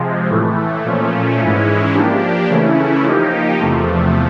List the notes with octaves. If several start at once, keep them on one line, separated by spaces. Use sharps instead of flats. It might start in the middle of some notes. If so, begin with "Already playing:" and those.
Already playing: C3 F3 G#3
A2 E3 A3
A#2 F3 A3 C#4
G#2 E3 G#3 C#4 E4
F3 A#3 D4 G4
C#3 E3 A3 C#4 E4
F3 A#3 D#4 G4
E2 C3 F3 A3